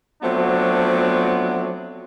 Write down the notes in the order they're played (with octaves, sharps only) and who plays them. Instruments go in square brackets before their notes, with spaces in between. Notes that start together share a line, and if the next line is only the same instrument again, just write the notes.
[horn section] F3 F#3 A3 B3 C4 D4